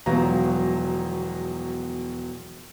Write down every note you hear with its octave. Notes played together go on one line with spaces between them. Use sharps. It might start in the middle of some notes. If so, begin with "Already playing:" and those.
E1 B2 F3 F#3 A#5